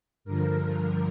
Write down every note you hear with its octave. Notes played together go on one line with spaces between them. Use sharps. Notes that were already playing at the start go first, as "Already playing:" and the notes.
G2 D3 F3 A#4